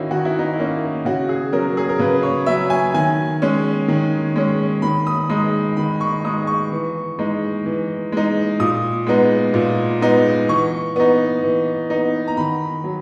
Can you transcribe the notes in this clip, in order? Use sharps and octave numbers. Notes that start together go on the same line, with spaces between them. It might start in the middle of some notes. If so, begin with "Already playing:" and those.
Already playing: D#3 A#3 C#4 D#4 E4 F#4 G#4
D#3 F#4
E4
D#4
E4
A#3 C#4
C#3 F#4
G#4
F#3 C#4 A#4
G#4
A#4
C#3 B4
C#5
F#3 C#4 E5
G#5
D#3 G#5
G#3 C#4
D#3
G#3 C#4
D#3 B5
D#6
G#3 D#4 D#6
D#3 B5
C#6
G#3 D#4 D#6
C#6
E3
G#3 D#4
E3
G#3 D#4
A#2 D#6
G#3 B3 D#4
A#2
G#3 B3 D#4
E3 C#6
B3 D#4
E3
B3 D#4
A#5
D#3 B5
F#3